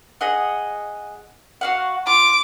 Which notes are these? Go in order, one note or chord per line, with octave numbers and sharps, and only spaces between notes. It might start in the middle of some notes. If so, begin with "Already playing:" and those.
G#4 D#5 F#5
F#4 F5 F#5
F4 D6